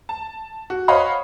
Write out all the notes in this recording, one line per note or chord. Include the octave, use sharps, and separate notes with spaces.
A5
F#4
C5 C#5 D#5 F5 F#5 B5